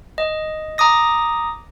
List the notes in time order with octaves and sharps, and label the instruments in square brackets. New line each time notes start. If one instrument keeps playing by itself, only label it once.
[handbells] D#5
A#5 D6 D#6 A#6